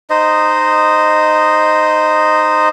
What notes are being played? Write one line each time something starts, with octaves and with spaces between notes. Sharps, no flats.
D#4 C5 D#5